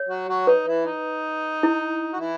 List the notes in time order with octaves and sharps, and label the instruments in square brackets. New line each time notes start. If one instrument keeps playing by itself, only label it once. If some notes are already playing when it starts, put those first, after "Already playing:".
Already playing: [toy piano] C#5
[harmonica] F#3 F#4
F#3 F#4
[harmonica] D#4 [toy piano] B4
[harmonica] E3 E4
D#4
[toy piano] E4
[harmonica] F#4
E3 E4